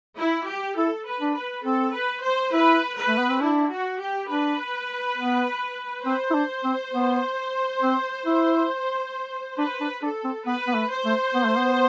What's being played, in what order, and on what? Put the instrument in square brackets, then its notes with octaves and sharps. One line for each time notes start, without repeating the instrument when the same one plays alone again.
[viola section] E4
G4
[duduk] E4 [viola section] A4
[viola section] B4
[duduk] D4
[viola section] B4
[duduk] C4 [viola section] A4
[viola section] B4
C5
[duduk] E4 [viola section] B4
[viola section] B4
[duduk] A3
B3
C4
[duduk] D4 [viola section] E4
[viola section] F#4
G4
[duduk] D4 [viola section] B4
[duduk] B3
[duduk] C4 [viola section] C5
[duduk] E4
D4
C4
B3
C4
E4
[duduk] D4 [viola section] B4
[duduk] D4
[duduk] D4 [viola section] A4
[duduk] C4
[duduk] B3 [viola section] B4
[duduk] B3
A3
[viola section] C5
[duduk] A3
B3
A3
B3